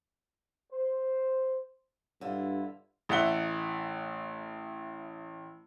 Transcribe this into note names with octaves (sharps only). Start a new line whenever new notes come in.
C5
G2 D3 E4 F4
A1 E5 F#5 G7